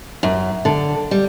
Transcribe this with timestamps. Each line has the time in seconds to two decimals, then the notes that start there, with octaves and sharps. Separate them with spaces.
0.23 F#2
0.65 D3
1.11 G3